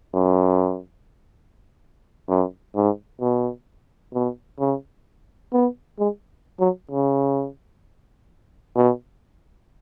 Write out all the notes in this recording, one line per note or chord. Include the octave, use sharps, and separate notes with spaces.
F#2
F#2
G#2
B2
B2
C#3
B3
G#3
F#3
C#3
B2